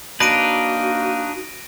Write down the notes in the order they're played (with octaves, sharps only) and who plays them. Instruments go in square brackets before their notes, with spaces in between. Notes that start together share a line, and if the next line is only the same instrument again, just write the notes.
[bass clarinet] A#3 [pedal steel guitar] D4 D#4 B4 [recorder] F#4 [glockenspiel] A#6 D7 D#7